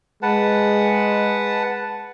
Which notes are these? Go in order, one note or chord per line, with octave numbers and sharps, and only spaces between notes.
G#3 B4 F#5 A5